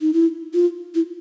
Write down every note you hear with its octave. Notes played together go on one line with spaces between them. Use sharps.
D#4
E4
F4
E4